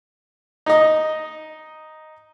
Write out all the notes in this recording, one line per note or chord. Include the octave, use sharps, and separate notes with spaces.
D#4 D#5